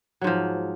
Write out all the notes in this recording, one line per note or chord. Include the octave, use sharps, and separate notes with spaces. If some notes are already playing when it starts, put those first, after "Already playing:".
G#2 F3 F#3